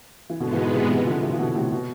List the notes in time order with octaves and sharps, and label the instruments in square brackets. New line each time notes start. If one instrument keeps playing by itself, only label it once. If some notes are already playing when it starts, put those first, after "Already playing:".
[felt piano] E3
[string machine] G#2 G#3 B3 [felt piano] B2 D3
[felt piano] E3
B2 D3
C3 E3
C3 E3
D3 F3
C3 E3
E3
B2 D3
A2 C3
B2